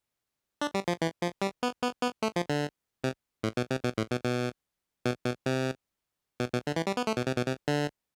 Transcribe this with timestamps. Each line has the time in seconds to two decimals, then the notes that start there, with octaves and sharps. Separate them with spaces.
0.61 D4
0.74 G3
0.88 F3
1.02 E3
1.22 F3
1.42 G3
1.63 B3
1.83 B3
2.02 B3
2.22 A3
2.36 F3
2.50 D3
3.04 C3
3.43 A2
3.57 B2
3.71 C3
3.84 B2
3.98 A2
4.11 B2
4.24 B2
5.06 B2
5.25 B2
5.46 C3
6.40 B2
6.53 B2
6.67 D3
6.76 E3
6.87 G3
6.97 B3
7.07 A3
7.17 B2
7.27 C3
7.37 B2
7.47 C3
7.68 D3